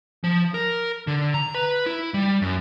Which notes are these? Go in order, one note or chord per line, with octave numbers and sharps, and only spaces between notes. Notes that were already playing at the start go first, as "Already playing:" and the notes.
F3
A#4
D3
A#5
B4
E4
G3
F#2